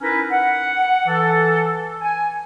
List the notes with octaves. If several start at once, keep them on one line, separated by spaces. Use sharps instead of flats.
C#4 D#4 E4 A#4 B4
F#5
E3 A4
G#5